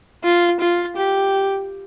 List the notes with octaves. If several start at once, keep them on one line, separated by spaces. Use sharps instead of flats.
F4
F4
G4